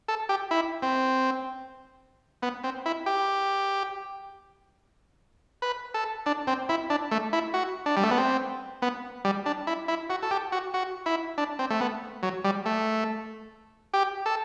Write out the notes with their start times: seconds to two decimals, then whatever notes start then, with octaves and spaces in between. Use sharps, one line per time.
0.08 A4
0.29 G4
0.51 E4
0.82 C4
2.42 B3
2.64 C4
2.86 E4
3.06 G4
5.62 B4
5.94 A4
6.26 D4
6.47 C4
6.69 E4
6.90 D4
7.11 A3
7.33 E4
7.54 F#4
7.86 D4
7.97 G3
8.03 A3
8.11 B3
8.18 C4
8.82 B3
9.25 G3
9.46 D4
9.67 E4
9.88 E4
10.10 F#4
10.23 A4
10.31 G4
10.52 F#4
10.74 F#4
11.06 E4
11.38 D4
11.59 C4
11.70 A3
11.81 B3
12.23 F#3
12.44 G3
12.65 A3
13.94 G4
14.26 A4